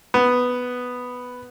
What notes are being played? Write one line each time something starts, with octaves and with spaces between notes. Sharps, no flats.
B3